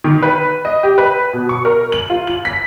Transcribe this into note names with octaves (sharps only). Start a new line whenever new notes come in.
D#3
B4
D#5
G4
B4
B2
C#6
A#4
F#7
F4
F#7
B6